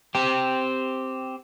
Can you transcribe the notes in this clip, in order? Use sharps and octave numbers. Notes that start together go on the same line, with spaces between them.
C4 G4